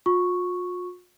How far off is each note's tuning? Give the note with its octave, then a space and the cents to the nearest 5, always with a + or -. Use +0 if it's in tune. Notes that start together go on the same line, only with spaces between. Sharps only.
F4 +45 C#6 +0